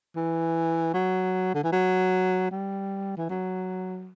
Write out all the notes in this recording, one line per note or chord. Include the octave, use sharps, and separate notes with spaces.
E3
F#3
D3
E3
F#3
G3
E3
F#3